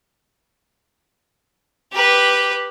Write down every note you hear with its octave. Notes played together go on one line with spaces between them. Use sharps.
G4 B4